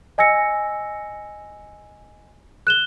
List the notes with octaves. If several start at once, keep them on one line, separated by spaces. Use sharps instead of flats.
D#5 G#5 E6 A#6 C#7
F#6 E7 G7